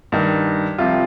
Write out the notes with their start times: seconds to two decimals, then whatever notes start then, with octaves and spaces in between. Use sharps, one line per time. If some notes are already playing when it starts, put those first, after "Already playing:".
0.12 G2 D#3
0.78 C2 C3 F3 F4